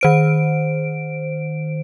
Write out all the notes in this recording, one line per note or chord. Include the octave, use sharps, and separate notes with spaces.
D#3 C5 D7